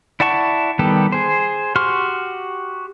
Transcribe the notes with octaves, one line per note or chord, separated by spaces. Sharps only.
E4 D5 F#5 A5 C#6
D#3 G3 B3 G4 A4
G#4 C5
F#4 G4 C6 C#6 F6